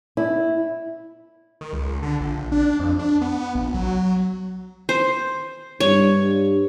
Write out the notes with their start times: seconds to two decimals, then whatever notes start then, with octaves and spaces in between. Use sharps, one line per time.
0.17 E4
1.61 D#3
1.73 C#2
2.03 D3
2.21 A#1
2.52 D4
2.80 F2
2.99 D4
3.21 B3
3.55 A#1
3.75 F#3
4.89 C5
5.80 G2 C#5